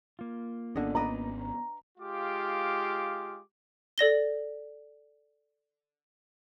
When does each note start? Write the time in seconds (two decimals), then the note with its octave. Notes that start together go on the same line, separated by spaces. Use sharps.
0.19 A#3 F4
0.76 G#1 D3 B3 C#4 D#5
0.95 B4 D5 D#5 A#5
1.98 G#3 F4 G4 F5 D6
3.98 A4 D5 A#6 G7